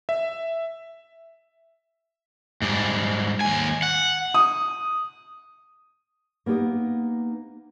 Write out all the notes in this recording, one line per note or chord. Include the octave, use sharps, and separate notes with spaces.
E5
G#2 G3
D#2 G#5
F#5
D#6
A#3 B3 D#4 G4 D#5